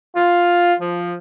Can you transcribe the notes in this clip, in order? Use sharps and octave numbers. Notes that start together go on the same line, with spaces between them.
F4
F3